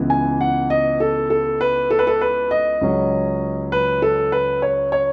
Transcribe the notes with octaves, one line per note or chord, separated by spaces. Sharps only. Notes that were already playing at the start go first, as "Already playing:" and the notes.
Already playing: C#2 C#3 E3 B3
G#5
F#5
D#5
A4
A4
B4
A4
B4
A4
B4
D#5
C#2 C#3 F#3 C#4
B4
A4
B4
C#5
C#5